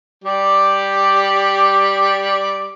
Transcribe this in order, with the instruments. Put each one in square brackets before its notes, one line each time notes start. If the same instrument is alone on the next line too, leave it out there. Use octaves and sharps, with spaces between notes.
[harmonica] G3 G4 D5